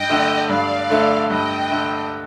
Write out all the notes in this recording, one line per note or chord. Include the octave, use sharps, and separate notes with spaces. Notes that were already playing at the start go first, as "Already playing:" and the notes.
Already playing: G2 D#5 G5
D3 A3
G2 D5 F5
D3 A3
G2 D#5 G5
D3 A3